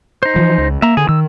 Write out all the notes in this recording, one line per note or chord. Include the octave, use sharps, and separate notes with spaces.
D#4 C5
E3 F3
C#2
A#3 E5 A#5
D3 G#4
D#3 E6